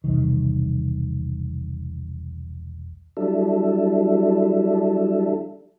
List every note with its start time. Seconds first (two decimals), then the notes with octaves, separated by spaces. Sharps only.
0.04 E1 C2 D#3
3.17 F#3 G3 D4 E4 A4